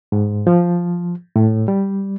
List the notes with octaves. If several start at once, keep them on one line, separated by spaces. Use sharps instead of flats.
G#2
F3
A2
G3